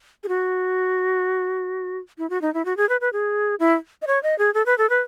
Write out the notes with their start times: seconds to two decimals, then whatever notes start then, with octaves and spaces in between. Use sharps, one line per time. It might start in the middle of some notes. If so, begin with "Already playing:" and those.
0.24 G#4
0.28 F#4
2.18 E4
2.30 F#4
2.42 D#4
2.54 E4
2.65 F#4
2.77 G#4
2.89 B4
3.01 B4
3.13 G#4
3.60 E4
4.02 D#5
4.07 C#5
4.23 D#5
4.39 G#4
4.54 A4
4.66 B4
4.78 A4
4.90 B4